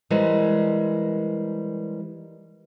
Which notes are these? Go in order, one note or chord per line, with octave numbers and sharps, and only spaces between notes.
E3 G3 G#3 A#4 C5